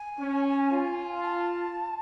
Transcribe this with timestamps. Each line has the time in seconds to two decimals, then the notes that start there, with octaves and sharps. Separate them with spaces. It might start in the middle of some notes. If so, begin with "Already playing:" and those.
Already playing: G#5
0.20 C#4
0.72 F4
1.23 A5